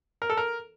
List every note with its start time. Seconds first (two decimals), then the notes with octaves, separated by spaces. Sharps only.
0.22 A#4
0.30 A4
0.37 A#4